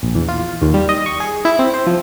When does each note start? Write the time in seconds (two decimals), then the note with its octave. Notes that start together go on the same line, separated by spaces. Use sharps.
0.03 A#1
0.15 E2
0.28 F4
0.62 D#2
0.74 G3
0.89 D#5
1.06 C#6
1.20 G#4
1.45 E4
1.59 C4
1.74 C5
1.87 F3